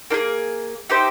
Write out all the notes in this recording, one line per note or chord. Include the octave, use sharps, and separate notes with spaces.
A#3 D#4 G#4
D#4 G4 C5 E5